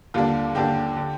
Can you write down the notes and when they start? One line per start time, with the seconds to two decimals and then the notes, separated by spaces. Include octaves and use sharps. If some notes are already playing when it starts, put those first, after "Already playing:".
0.14 D#2 D3 G3 A#3 D4 F4
0.55 D#2 D3 G3 A#3 D4 G4
0.97 D3